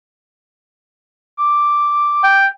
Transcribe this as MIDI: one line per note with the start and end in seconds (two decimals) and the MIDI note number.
1.39 2.34 86
2.24 2.47 79